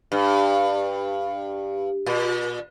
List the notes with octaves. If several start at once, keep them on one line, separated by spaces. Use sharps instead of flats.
G2
A#2